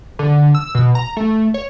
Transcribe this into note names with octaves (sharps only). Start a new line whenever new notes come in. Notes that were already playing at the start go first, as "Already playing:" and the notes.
D3
E6
B2
A#5
A3
C#5